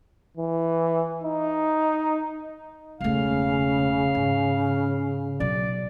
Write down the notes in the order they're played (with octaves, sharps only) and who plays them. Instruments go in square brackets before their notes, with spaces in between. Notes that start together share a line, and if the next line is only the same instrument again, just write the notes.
[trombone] E3
D#4
[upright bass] E1 A3 [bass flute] C#3 [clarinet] F5
[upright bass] G#2
[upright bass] B2 F#3 [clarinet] D5